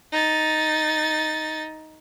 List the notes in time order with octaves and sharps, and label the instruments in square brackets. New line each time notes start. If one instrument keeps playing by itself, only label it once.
[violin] D#4 A6